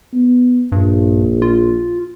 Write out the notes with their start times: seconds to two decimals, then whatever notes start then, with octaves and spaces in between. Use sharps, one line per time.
0.14 B3
0.72 A#1 G2
1.42 F4